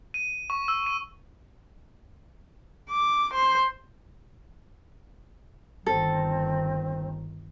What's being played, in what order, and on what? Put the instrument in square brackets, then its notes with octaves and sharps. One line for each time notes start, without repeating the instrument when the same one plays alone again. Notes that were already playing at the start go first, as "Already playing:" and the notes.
[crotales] D#7
C#6
E6
D#7
[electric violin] D6
C5
[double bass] G1 D#3 [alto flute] C4 [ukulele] A4